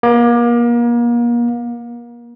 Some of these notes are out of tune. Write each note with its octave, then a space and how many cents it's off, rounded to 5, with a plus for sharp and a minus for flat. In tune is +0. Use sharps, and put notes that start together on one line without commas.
A#3 +35